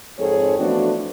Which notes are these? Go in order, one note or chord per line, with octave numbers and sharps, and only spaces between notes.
F2 G#2 C4 G#4 A4 C#5
E3 F3 A3 B3 D4 F#4